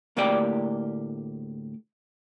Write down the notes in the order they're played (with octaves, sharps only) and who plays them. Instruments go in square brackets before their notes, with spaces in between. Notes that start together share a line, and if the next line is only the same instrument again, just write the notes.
[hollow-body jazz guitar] D2 A2 A#3 G4 D5 G5